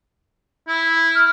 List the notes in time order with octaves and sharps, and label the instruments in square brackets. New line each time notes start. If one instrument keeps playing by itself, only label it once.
[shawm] E4
[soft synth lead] F6